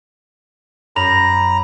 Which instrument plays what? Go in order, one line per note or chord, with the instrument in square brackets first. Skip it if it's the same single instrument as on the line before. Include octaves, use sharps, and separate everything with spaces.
[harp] F#2 [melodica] A#5 [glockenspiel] B5 A#6 F7